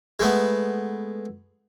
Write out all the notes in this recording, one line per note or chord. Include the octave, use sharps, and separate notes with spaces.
G#3 A3 B3